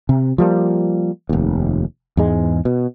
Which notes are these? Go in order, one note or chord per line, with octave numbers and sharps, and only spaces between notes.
C3
F3 G3 A#3
F1 D#2
E2 G#2 G#3
B2